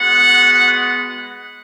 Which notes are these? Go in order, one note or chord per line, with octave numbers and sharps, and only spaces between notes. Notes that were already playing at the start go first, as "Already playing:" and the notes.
Already playing: G#3 B3 F#4 F#5